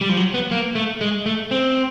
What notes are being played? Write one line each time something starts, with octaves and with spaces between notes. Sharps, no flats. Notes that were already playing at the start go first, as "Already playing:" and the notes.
G3
F3
F#3
B3
A#3
A3
G#3
A3
C4